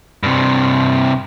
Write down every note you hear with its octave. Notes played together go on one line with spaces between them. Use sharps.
G2 C3